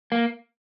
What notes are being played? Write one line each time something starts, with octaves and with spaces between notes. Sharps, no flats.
A#3